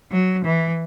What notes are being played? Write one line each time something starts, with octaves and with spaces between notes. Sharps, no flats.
F#3
E3